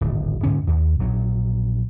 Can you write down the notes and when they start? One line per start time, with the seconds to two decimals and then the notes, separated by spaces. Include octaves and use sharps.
0.01 D1 G#1
0.43 D2 G#2 D3 C#4
0.67 D#2
0.99 A#1 F#3